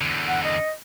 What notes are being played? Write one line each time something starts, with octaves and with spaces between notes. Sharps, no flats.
E2 D3
F#5
D#5